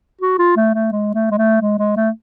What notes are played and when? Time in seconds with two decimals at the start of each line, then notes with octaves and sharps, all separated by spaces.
0.21 F#4
0.39 F4
0.57 A3
0.74 A3
0.92 G#3
1.14 A3
1.31 G#3
1.38 A3
1.62 G#3
1.79 G#3
1.97 A3